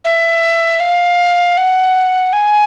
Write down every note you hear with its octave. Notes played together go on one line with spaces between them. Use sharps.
E5
F5
F#5
G#5